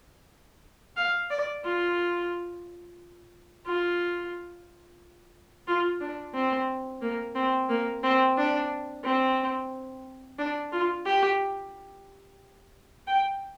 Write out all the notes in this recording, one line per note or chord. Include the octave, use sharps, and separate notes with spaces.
F5
D5
F4
F4
F4
D4
C4
A#3
C4
A#3
C4
D4
C4
D4
F4
G4
G5